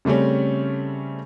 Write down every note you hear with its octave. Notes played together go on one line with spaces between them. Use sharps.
C#3 G3 A3 C4 C#4